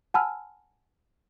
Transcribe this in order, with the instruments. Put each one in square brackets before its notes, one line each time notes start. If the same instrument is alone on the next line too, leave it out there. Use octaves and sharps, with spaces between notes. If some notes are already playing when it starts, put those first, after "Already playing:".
[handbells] F#5 G#5 A5 B5 E6 F6